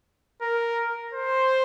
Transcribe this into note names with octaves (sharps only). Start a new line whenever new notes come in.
A#4
C5